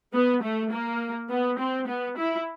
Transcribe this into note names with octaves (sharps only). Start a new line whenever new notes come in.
B3
A3
A#3
B3
C4
B3
E4